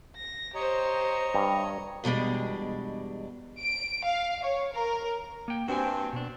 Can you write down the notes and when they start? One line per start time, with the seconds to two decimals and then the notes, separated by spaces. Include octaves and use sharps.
0.17 A#6
0.55 G4 C5 C#5 D#5 A#5
1.34 G2
2.04 E2 B2 G3 G#3 D4
3.60 D7
4.05 F5
4.44 C#5
4.74 A#4
5.48 A#3 G5
5.68 G2 C4 F#4 G#5
6.13 B2 D4